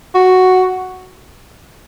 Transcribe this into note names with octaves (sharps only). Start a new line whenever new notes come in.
F#4